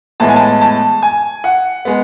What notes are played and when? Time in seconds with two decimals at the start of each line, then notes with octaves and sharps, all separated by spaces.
0.20 A2 E3 G#3 B3 A5
0.29 G#5
0.36 A5
0.61 A5
1.03 G#5
1.44 F#5
1.85 G#3 B3